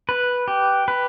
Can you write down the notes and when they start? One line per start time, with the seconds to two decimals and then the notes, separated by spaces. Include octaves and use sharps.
0.09 B4
0.48 G4
0.88 B4